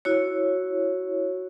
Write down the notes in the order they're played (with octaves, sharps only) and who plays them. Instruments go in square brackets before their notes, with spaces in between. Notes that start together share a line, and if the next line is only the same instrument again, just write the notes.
[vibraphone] E4 F#4 C#5